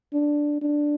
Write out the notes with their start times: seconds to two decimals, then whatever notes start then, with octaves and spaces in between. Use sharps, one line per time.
0.13 D4
0.62 D4